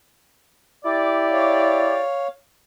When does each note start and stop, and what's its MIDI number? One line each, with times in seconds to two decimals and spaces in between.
0.85 2.00 64
0.85 2.00 67
0.85 2.00 74
1.31 2.28 73
1.31 2.28 77